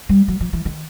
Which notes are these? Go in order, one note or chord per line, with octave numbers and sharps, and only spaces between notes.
G3
F#3
F3
E3
D#3